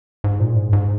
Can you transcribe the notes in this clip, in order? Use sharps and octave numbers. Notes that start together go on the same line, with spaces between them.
G#2
A#2
G#2
G#2